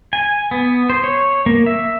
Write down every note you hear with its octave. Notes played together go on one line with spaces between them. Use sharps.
G#5
B3
C5
C#5
A#3
E5